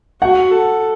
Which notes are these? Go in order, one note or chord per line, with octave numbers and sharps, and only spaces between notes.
F#4 F#5
A4